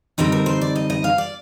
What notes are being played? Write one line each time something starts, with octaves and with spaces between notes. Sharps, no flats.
D3 G3 C4 D#4 A#4
A#4
C5
D5
D#5
D#5
F5
D5